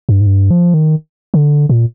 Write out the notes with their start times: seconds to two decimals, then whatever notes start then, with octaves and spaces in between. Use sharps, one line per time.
0.09 G2
0.21 G#2
0.27 G2
0.51 F3
0.74 D#3
1.34 D3
1.69 A#2